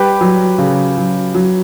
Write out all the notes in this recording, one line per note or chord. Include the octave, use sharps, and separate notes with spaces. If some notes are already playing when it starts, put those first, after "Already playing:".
Already playing: G3 G4 B4
F#3
C#3
F#3
F#3